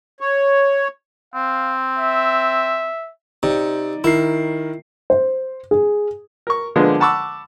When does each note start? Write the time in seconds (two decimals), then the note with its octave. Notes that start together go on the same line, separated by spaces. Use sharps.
0.20 C#5
1.34 C4 F5
1.98 E5
3.43 C3 D#4 D5
4.04 D#3 E4 A#4 C7
5.10 C5
5.71 G#4
6.47 A#4 C#6
6.76 D3 F3 G#3 A#3 B3 D4
7.00 F#5 A5 B5 C#6 D6 E6